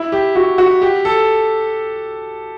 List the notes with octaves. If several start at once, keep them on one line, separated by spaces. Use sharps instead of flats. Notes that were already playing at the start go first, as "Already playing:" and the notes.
Already playing: E4
G4
F#4
F#4
G4
A4